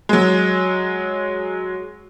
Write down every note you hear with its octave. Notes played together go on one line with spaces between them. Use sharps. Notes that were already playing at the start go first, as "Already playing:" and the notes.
F#3 G#3